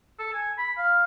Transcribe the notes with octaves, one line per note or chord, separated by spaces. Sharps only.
A4
G#5
B5
F5